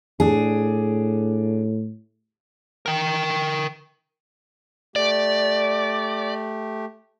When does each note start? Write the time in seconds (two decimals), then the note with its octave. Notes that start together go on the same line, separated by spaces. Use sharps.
0.20 A2 D4 G#4
2.86 A#4 G5
4.96 A3 G4 D5